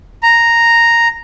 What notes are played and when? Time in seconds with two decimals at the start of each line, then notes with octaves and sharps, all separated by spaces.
0.23 A#5